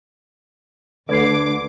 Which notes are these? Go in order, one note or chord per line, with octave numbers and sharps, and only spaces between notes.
D2 D3 B4 D6 G#6 C7